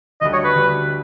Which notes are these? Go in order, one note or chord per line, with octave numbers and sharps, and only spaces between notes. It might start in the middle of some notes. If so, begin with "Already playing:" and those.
D2 D3 G3 D#5
C#5
B4
D2 D3 G3